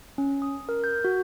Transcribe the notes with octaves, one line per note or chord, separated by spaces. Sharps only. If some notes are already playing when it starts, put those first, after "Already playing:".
C#4
D#6
A#4
G6
F#4